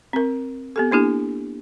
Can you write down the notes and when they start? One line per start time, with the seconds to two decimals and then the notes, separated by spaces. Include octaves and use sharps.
0.13 C4 A#4
0.76 B3 G4 A4
0.91 A#3 D4 E4 G4